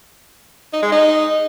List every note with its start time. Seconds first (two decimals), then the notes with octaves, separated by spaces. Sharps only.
0.73 D#4
0.82 G#3
0.92 D#4